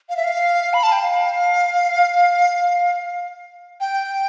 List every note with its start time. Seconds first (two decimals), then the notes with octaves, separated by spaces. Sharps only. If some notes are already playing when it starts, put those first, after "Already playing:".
0.09 F5
0.17 E5
0.24 F5
0.74 B5
0.83 A5
0.92 G5
1.02 F5
3.81 G5